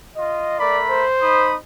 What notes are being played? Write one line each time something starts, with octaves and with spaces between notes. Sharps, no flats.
F4 D#5
A3 A#4 D5 B5
C5
D#4 B5 D#6